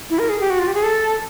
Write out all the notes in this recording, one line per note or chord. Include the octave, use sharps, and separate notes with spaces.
E4
A#4
G#4
G4
F#4
F4
G4
G#4
A4